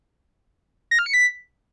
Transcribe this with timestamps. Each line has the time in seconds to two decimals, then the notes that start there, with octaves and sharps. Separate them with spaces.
0.91 A#6
0.99 F6
1.06 C#7
1.14 B6